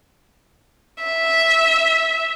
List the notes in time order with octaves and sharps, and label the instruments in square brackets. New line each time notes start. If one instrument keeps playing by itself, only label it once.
[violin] E5